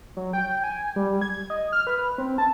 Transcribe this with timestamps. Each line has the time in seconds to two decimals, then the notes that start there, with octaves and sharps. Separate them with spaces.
0.17 F#3
0.33 G5
0.64 G#5
0.96 G3
1.22 G#6
1.50 D#5
1.72 F6
1.87 B4
2.18 C4
2.38 A5